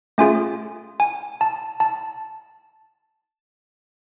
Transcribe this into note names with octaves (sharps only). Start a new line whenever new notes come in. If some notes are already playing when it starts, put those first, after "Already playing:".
A3 C#4 F4 G#4 G#5
G#5
A5
A5